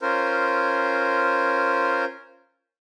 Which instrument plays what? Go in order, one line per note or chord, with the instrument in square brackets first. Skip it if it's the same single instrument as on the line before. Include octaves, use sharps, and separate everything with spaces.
[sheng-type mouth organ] C#4 F4 A#4 C5